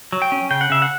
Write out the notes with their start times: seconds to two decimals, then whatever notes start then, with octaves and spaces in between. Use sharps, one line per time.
0.12 F#3
0.22 G5
0.32 C#4
0.50 C#3 G5
0.61 F#5
0.70 C#3 E5
0.82 F#5